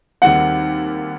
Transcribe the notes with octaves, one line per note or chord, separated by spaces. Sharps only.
D#2 D#3 G3 C4 F#5